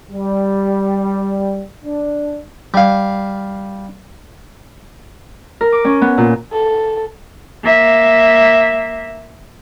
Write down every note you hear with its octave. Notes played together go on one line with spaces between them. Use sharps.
G3
D4
G3 F5
A#4
D6
C#4
B3
A#2
A4
A#3 E5